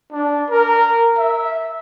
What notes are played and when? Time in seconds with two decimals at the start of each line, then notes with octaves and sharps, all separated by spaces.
0.12 D4
0.50 A#4
1.18 E5